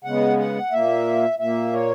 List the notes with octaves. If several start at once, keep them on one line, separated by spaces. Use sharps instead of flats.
C#3 G#3 B3 F#5
F#5
A#2 A#3 E5
A#2 A#3 E5
C#5